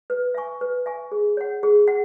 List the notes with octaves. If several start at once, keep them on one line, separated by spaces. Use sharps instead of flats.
B4
E5 G#5 C#6
B4
E5 G#5 C#6
G#4
C#5 F#5
G#4
F#5